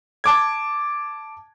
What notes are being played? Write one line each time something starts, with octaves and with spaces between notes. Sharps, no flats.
A5 D6 G#6